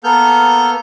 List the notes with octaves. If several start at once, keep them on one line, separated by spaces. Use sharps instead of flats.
A#3 B3 A4 F6 G6